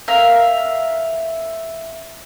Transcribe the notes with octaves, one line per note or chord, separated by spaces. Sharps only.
A#4 E5 F5